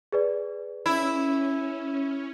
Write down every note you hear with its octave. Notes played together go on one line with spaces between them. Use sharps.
G#4 B4 D5
C#4 E4